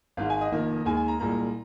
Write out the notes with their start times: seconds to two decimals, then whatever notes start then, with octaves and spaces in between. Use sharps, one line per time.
0.17 G#1 G#2 G#3 F5
0.30 G#5
0.41 D#5
0.52 F1 F2 D#3 A#3
0.85 D#2 D#3 G#3 G#5
0.97 G#5
1.08 A#5
1.19 C2 A#2 G#3 A#5